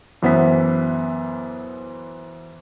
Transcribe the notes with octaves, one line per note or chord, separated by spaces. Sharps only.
F#2 E3 B3 C5 E5 B6